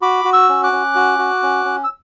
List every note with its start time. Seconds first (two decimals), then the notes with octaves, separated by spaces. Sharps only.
0.02 F#4 B5 D6
0.25 F#4
0.33 C#6 E6
0.49 C#4
0.63 D6 F#6
0.72 C#4
0.95 F#4
1.19 F#4
1.43 C#4
1.65 C#4
1.84 E6